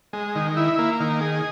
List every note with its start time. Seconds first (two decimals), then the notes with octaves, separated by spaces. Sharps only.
0.13 G#3
0.35 D#3
0.57 E4
0.78 A#3
1.00 D#3
1.21 G#4